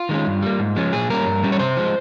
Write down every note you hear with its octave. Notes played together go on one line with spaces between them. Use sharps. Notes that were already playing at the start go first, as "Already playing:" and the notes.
Already playing: F4
D#3 G#3 C#4
G2
G3 A#3
G#2
F3 G#3 C#4
A#2 G#4
G3 A#3 C#4 A#4
G2
G3 C#4
C#5
C3 C5
F3 G#3